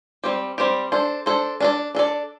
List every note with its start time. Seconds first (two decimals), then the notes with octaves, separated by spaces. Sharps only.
0.24 G3 C4 G4
0.58 G3 C4 G4
0.92 D4 A4 C5
1.26 D4 A4 C5
1.61 D4 A4 D5
1.95 D4 A4 D5